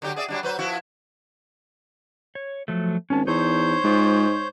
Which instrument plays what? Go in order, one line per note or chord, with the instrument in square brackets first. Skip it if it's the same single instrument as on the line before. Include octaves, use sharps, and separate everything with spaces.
[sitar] D3 F#3 G4
G#4 D5 E5
F#3 G3 D4
F#3 B4 C5
F3 E4 F#4
[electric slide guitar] C#5
F3 F#3 A3
[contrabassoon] G#1 [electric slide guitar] C#4 A5
[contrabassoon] E2 [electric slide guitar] D#4 [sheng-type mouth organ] C5 C#5 G6
[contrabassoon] G#2 [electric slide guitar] G#3 F4